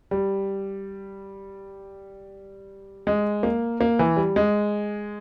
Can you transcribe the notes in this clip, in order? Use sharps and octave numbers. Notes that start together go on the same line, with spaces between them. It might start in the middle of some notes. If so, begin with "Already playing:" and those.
G3
G#3
A#3
A#3
E3
G3
G#3